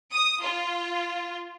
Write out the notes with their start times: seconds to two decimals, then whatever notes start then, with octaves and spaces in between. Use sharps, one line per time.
0.13 D#6
0.43 F4